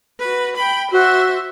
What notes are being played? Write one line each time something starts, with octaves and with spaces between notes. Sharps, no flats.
F#4 B4
G5 B5
F#4 C5 E5